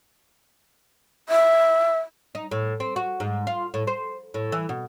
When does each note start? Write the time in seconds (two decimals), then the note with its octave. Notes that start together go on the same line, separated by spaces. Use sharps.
1.29 E5
2.35 D#4
2.51 A2
2.80 C4
2.96 F#4
3.20 G#2
3.47 F4
3.74 A2
3.87 C5
4.34 A2
4.52 E3
4.69 B2